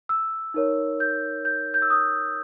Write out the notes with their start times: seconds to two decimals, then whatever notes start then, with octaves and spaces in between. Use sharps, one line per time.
0.09 E6
0.54 D#4 A#4 C#5
1.00 G6
1.45 G6
1.74 G6
1.82 E6
1.90 D#6